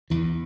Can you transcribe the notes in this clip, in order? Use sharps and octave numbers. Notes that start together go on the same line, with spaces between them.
E2 E3